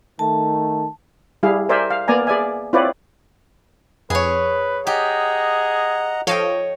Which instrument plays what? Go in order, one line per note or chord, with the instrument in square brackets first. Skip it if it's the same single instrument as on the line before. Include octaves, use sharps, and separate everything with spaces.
[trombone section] D#3 A3 [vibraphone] A5
[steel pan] G3 E4 G#4 F5
A#4 C5 D5 E5 G#5
F5
A#3 B3 D5 G#5 A#5
G#4 D5 E5 G#5
C4 E4 F4 B4 C#5 D5
[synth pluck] F2 [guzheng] G#4 C#5 [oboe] B4
[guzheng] G4 [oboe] G#4 [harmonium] D#5 F#5 A#5
[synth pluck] F3 A4 F5 [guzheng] C#5 D#5 G5